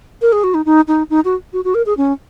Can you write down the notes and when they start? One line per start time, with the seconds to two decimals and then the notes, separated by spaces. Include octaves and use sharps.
0.22 A#4
0.32 G#4
0.44 F#4
0.54 D#4
0.65 D#4
0.88 D#4
1.10 D#4
1.25 F#4
1.53 F#4
1.64 F#4
1.74 A#4
1.86 G#4
1.97 C#4